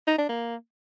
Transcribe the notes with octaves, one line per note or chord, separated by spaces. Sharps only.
D#4
D4
A#3